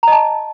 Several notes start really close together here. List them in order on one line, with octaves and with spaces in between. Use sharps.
A#5 D#5 A5